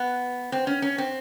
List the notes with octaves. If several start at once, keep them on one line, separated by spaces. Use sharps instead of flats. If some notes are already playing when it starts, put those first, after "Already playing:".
Already playing: B3
C4
C#4
C#4
C4